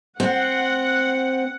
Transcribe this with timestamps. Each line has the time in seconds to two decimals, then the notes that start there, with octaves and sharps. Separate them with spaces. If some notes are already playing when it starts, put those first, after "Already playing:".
0.20 C4 F#5